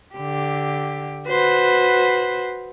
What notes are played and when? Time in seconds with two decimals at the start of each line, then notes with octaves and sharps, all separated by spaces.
0.15 D3 G4
1.28 F#4 B4 C5